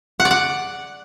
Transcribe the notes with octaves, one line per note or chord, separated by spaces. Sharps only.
F#5
D5
F#5